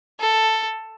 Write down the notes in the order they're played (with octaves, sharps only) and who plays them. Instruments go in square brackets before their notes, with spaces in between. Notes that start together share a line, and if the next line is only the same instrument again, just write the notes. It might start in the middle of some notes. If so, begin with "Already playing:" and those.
[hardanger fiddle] A4